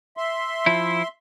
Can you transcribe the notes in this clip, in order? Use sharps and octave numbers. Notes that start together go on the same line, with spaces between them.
E5 C6
F3 E4